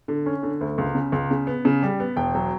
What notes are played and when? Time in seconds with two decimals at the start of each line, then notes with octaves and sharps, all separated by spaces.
0.08 D3
0.26 C#4
0.43 D3
0.61 D2
0.78 C#2
0.95 C#3
1.12 C#2
1.31 C#3
1.47 B3
1.65 C#3
1.82 G3
2.00 B3
2.16 E1 G5
2.35 F#3